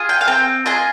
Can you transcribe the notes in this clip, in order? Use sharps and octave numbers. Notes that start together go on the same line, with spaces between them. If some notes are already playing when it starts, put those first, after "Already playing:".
Already playing: F4 G#4
G5
F5
C4 G5
F4 G#4 D#5